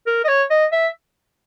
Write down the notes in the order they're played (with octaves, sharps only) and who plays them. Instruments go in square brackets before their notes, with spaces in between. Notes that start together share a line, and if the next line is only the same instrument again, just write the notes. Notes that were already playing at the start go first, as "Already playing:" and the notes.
[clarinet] A#4
D#5
C#5
D#5
E5